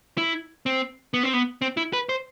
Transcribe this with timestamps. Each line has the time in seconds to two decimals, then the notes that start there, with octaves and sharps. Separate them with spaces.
0.18 E4
0.66 C4
1.14 B3
1.23 C4
1.33 B3
1.62 C4
1.77 E4
1.93 B4
2.09 C5